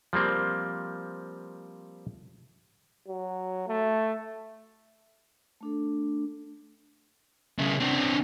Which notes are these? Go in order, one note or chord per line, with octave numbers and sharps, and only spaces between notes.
F3 G3 A#3 C4
F#3
A3
A3 D4 A4
C#3 E4
C4 D4